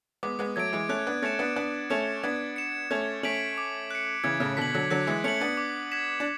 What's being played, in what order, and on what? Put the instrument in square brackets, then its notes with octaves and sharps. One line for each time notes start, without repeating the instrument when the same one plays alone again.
[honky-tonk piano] G#3 B3 [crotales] D6
[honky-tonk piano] G#3 B3
[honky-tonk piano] F#3 A3 [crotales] G#6 D7
[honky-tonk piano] E3 G#3
[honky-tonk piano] A3 C#4 [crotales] F#6
[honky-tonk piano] B3 D4
[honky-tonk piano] A3 C#4 [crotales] A6 C#7 E7
[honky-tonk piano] B3 D4
[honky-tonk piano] B3 D4 [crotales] F#6
[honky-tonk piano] A3 C#4 [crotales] C#7 E7
[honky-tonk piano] B3 D4 [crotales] G#6
[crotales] C#7 E7
[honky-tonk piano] A3 C#4 [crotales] G#6
[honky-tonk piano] A3 C#4 [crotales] B6 D7 F#7
[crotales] D6
F#6 C#7
[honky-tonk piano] C#3 E3 [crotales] G#6
[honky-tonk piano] A2 C#3
[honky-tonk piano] B2 D3 [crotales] B6 F#7
[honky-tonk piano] D3 F#3
[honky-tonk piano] D3 F#3 [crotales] F#6
[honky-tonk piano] E3 G#3
[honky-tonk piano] A3 C#4 [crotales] C#7 F#7
[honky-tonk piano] B3 D4
[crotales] D6
G#6 B6 E7
[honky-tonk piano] D4